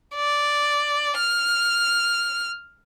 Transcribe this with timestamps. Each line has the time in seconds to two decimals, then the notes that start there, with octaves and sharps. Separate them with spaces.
0.16 D5
1.18 F6